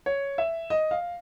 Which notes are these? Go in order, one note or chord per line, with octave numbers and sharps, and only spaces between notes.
C#5
E5
D#5
F5